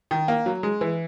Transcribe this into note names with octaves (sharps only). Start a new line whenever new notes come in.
D#3
A#3
F#3
G#3
E3